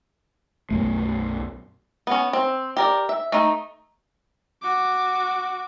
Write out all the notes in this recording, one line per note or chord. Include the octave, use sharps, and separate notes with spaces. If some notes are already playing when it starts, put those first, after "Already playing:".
B1 F#2 A3
B3 C#4
C4
G4 A#4 D5
E5
A3 D#4
F#4 D6